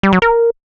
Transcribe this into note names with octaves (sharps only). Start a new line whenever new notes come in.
G3
F#3
A#4